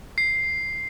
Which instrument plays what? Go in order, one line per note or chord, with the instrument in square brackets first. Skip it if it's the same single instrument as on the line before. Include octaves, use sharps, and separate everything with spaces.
[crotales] C7